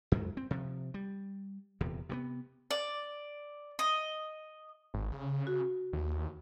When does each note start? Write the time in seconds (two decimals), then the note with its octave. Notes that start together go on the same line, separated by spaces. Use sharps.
0.12 F2 G#2 F#3
0.37 C4
0.51 C3 F3
0.94 G3
1.81 D#1 E2 C3
2.09 C3 G#3 B3
2.71 D5
3.79 D#5
4.94 G#1
5.12 C#3
5.47 F#4
5.93 D#2